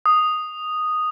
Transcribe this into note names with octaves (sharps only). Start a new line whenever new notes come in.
D#6